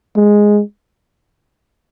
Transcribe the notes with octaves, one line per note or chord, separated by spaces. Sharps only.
G#3